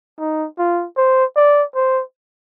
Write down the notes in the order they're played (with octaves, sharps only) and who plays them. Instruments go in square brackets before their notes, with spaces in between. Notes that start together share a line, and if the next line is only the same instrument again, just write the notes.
[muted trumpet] D#4
F4
C5
D5
C5